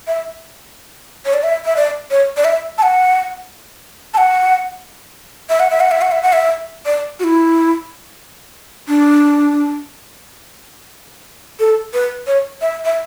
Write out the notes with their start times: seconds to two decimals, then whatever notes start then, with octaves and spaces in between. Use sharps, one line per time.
0.07 E5
1.26 C#5
1.33 D5
1.43 E5
1.65 E5
1.76 D5
2.11 C#5
2.37 D5
2.44 E5
2.78 A5
2.83 F#5
4.14 A5
4.18 F#5
5.49 E5
5.60 F#5
5.70 E5
5.80 F#5
5.91 E5
6.01 F#5
6.11 E5
6.22 F#5
6.33 E5
6.86 D5
7.19 F#4
7.24 E4
8.88 D4
11.60 A4
11.94 B4
12.27 C#5
12.61 E5
12.85 E5